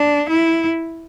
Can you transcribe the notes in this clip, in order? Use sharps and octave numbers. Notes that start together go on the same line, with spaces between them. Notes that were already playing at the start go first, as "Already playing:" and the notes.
Already playing: D4
E4